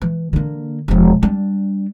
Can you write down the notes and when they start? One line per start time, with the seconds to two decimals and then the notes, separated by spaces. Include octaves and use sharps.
0.02 E3
0.33 D3 A#3
0.88 E1 F3
1.23 G3 D4